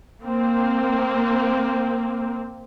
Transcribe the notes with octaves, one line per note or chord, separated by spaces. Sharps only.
A#3 C4